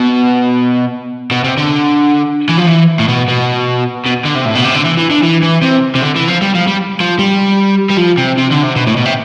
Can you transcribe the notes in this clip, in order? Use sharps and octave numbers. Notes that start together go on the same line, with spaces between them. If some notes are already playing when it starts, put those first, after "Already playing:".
Already playing: B2
B2
C3
D3
E3
F3
E3
A2
B2
B2
B2
D3
C3
A2
B2
C3
D3
E3
E3
D3
E3
E3
C3
C3
D3
E3
F3
G3
F3
G3
F3
G3
G3
F3
C3
C3
D3
C3
B2
A2
B2
C3